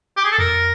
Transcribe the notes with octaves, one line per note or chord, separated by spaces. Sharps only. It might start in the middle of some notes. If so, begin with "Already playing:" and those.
G4
G#4
A4
F2 A#4